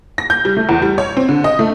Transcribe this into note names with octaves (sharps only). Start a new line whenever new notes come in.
A#6
G6
G3
A3
E2
G3
C#5
C4
D3
D#5
A3